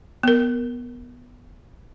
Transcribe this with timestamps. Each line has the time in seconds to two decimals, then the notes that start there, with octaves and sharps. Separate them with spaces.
0.23 B3 A#4